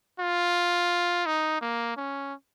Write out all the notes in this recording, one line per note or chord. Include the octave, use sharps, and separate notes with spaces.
F4
D#4
A#3
C#4